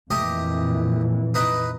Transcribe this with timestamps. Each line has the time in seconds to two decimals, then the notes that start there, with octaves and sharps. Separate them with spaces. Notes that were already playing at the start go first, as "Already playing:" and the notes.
0.11 F2 A#2 E3 A3 G4 D#5
1.34 D#4 B4 D#5